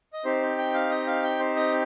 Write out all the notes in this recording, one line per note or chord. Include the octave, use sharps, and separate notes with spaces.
D#5
C4 D#4 G4 C5
G5
F5
D#5
F5
G5
C5
D#5